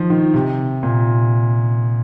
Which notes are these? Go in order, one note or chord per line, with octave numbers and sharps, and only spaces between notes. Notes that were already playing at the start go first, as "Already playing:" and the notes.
Already playing: D#3 F3
D#3
C3
A#2